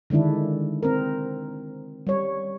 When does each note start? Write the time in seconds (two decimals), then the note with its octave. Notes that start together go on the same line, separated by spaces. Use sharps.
0.10 D3 D#3 G#3 D4 E4
0.83 C4 A#4
2.07 G3 C#5